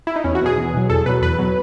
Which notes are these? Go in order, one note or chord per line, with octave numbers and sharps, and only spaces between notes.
E4
D#4
E2 C#4
F#4
B2 F#3 G#4
E2
B2 F#3
E2 A4
B2 F#3 B4
E2 B4
B2 F#3